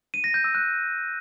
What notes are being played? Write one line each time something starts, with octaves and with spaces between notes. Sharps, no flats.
D#7
A#6
G6
E6
F#6